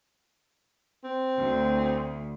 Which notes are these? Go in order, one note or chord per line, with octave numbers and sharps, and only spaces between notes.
C4
D2